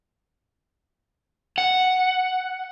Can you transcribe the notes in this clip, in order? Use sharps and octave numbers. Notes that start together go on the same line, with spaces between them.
F#5